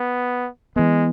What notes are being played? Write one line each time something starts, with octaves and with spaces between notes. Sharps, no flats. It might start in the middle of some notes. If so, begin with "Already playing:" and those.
Already playing: B3
E3 G#3 B3